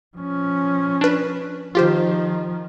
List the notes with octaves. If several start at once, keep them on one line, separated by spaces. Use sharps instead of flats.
F3 C#4
D4 B4
D#3 F3 F4 G4 C5